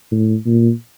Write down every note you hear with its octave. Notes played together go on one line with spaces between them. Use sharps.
A2
A#2